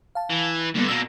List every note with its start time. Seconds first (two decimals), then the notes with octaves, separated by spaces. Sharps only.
0.15 F5 A5
0.30 E3
0.75 G2 D3 A#3 B3
0.88 B2 A#3 E6